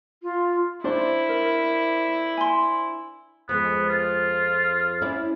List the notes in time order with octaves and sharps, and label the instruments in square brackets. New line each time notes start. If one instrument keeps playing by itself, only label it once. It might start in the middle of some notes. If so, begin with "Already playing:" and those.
[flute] F4
[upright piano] D4 C5 [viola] E4
[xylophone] A#4
G#5 C6
[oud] F2 G#3 [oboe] B3
[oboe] F4
[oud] C#4 E4 D5